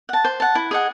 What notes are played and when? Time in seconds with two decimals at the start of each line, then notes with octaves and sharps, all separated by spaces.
0.09 F#5 A5
0.24 C5
0.40 F#5 A5
0.55 E4
0.71 G#4 D#5 F#5